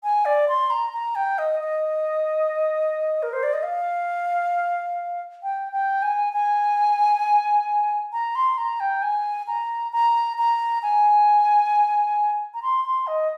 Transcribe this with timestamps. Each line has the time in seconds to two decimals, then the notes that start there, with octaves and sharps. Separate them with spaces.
0.03 G#5
0.25 D5
0.49 C6
0.71 A#5
0.93 A#5
1.15 G5
1.38 D#5
1.60 D#5
3.23 A#4
3.33 C5
3.43 D5
3.53 D#5
3.63 F5
5.43 G5
5.72 G5
6.02 G#5
6.33 G#5
8.13 A#5
8.35 C6
8.58 A#5
8.80 G5
9.02 G#5
9.47 A#5
9.93 A#5
10.38 A#5
10.83 G#5
12.54 A#5
12.63 C6
12.85 C6
13.07 D#5